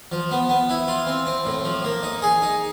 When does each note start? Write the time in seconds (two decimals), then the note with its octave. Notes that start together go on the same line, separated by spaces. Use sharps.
0.12 F3
0.31 B3
0.49 B3
0.69 E4
0.88 F4
1.07 C4
1.27 C4
1.45 A2
1.65 F3
1.84 A#3
2.03 D#4
2.22 G#4
2.42 D#4